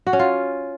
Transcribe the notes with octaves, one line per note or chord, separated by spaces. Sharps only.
F#4
C#4
F4